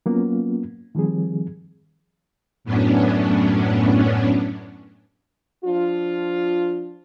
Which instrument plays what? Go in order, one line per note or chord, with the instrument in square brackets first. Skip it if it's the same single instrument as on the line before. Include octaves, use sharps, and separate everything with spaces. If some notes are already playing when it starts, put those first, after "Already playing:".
[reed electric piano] F#3 A#3 B3 C#4 F4
D#3 F3 G3 C4 G#4
[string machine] F#2 A2 F#3 B3 C#4 D4
[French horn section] F3 D4 F4